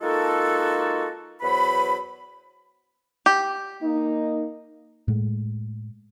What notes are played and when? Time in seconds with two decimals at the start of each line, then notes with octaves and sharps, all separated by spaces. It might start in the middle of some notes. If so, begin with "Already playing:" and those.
0.01 G#3 A#3 D#4 F4 F#4 A4
1.41 E2 F#3 B4 C5 B5
3.26 G4
3.82 A#3 D#4
5.08 A2 G#3